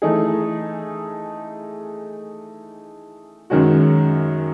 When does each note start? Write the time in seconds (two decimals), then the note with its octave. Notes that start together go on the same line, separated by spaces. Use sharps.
0.02 E3 A3 D#4 G#4
3.50 F#2 D#3 G#3 C#4 F#4